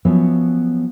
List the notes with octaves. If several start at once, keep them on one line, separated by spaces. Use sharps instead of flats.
F3 F#3 B3 C#4 C#5 E5